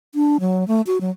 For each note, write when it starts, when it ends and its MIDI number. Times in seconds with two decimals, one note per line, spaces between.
0.15 0.37 62
0.40 0.67 54
0.68 0.81 57
0.87 0.98 66
1.01 1.10 54